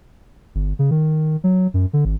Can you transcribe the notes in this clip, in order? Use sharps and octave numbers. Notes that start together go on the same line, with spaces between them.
G1
C#3
D#3
F#3
F#2
D3
G#1